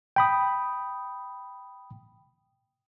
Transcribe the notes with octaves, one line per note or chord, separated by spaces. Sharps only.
G5 B5 D#6